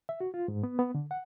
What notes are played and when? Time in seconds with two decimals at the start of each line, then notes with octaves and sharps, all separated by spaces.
0.09 E5
0.20 F#4
0.34 F4
0.48 G#2
0.63 B3
0.79 B3
0.95 D3
1.11 F#5